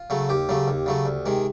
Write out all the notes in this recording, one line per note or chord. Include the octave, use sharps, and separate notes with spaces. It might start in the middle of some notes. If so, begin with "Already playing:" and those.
Already playing: F4
C#3 F#3 A3
D#2 G4
C#3 F#3 A3
D#2
C#3 F#3 A3
D2
C3 D#3 G#3